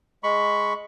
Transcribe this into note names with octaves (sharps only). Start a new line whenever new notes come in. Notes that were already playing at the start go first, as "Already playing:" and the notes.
G#3 B5 C#6